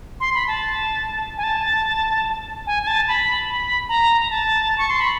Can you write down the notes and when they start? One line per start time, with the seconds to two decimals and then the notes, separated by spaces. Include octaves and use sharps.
0.20 C6
0.34 B5
0.48 A5
1.38 G#5
1.43 A5
2.67 G#5
2.83 G#5
2.87 A5
3.08 B5
3.49 B5
3.89 A#5
4.21 A#5
4.31 A5
4.78 C#6
4.90 C6
5.00 B5